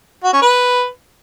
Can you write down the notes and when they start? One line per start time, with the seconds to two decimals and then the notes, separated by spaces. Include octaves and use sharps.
0.24 F#4
0.33 C#4
0.42 B4